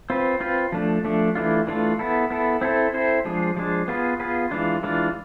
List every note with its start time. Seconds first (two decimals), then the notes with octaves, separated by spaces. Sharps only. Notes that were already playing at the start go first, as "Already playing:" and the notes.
0.10 C4 F4 B4
0.40 C4 F4 B4
0.72 F3 A3 D4
1.05 F3 A3 D4
1.35 E3 A3 D4 F4
1.67 E3 A3 D4 F4
1.99 B3 E4 A4
2.30 B3 E4 A4
2.61 C4 E4 A4 C5
2.94 C4 E4 A4 C5
3.25 F3 G#3 D4 G#4
3.56 F3 G#3 D4 G#4
3.88 B3 F4 G#4 B4
4.20 B3 F4 G#4 B4
4.51 E3 G#3 D4 F4
4.83 E3 G#3 D4 F4